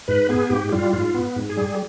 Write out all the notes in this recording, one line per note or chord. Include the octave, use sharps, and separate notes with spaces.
G#2 B4
B3 G#4
G#2 G4
G3 F4
G#2 F4
B3
G#2
G#4
G3